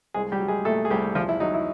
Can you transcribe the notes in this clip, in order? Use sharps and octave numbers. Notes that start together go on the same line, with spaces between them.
C2 G#3 G#4
G3 G4
F#3
G#3 G#4
A#2 A3 A4
G#4
C2 G3 G4
E2 F3 F4
E4
F#3 D#4
E4